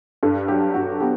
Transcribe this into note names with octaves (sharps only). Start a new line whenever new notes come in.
G2 A4
F#3 G4
G2 F#4
B3 G4